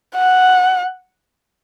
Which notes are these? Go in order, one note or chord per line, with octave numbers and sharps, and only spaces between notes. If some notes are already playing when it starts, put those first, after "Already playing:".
F#5